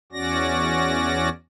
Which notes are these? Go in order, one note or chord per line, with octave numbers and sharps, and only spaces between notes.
E2 C#4 F#4 D5 A#6